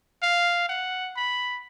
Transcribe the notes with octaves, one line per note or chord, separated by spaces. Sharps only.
F5
F#5
B5